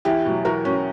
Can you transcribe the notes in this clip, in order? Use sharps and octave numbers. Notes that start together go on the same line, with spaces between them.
E2 E4 G4
B2 F#3
E2 F#4 A#4
B2 F#3 C#4